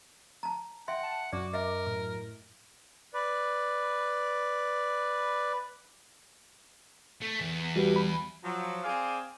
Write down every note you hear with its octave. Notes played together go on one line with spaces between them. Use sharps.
A5 A#5
E5 F#5 G5 C6
A5
F#2 F#4 D5 D6
A#4 D#5 E5
A2
B4 D5
A3
E2
G3 F#4 G4 B4
B5
F3 F#3
C4 G#4 D5 F5 G#5